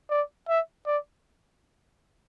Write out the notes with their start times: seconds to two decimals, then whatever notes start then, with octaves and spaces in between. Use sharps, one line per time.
0.10 D5
0.48 E5
0.86 D5